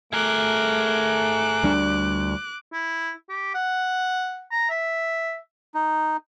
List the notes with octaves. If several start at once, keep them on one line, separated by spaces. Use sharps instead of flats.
A3 G#4 A#4 D6 F#6
D2 G3 D4
E4
G4
F#5
A#5
E5
D#4